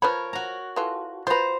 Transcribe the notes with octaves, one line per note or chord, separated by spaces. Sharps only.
F3 A#4 B4 C#5 B5
F#4 A#5
E3 F4 A4
F4 B4 C5 A#5